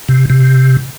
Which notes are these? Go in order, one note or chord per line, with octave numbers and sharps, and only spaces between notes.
C3
C3